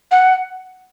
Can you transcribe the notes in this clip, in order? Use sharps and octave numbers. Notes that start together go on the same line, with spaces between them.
F#5